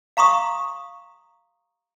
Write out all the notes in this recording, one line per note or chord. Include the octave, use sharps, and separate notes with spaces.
F5 A#5 C6 C#6 D#6